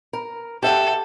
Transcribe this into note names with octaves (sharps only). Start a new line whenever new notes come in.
A#4
G4 A4 E5 F#5